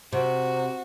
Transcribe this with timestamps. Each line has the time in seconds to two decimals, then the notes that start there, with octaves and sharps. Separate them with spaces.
0.13 C3 F#4